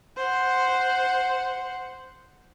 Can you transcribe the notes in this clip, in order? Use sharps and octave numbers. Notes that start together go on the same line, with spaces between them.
C5 F#5